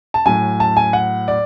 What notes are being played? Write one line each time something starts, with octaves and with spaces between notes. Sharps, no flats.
A5
A2 F#3 G#5
A5
G#5
F#5
D5